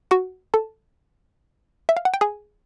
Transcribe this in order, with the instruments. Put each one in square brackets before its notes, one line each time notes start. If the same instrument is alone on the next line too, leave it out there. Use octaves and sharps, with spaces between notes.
[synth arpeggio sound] F#4 F#5
A4 A5
E5
F5
F#5
G5
G#4 G#5